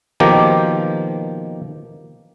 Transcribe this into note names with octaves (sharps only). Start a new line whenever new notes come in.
B2 D#3 F3 A#3 G4